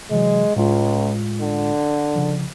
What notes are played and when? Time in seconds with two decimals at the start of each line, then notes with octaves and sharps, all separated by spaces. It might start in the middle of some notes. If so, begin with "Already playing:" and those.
0.11 C3 E3 F#3 G#3
0.56 C#2 A2 G#3 F4
1.41 D3
2.15 C#3 F3